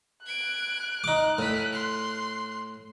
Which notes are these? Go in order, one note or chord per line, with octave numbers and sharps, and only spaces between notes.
F#6 G#6 D7
D#4 D6
A2 B6 D#7
C6